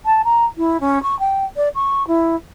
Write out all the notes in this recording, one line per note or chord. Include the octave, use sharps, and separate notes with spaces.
A5
A#5
E4
C#4
C#6
G5
D5
C#6
E4